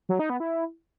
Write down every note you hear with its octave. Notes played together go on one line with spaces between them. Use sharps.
F#3
D#4
B3
E4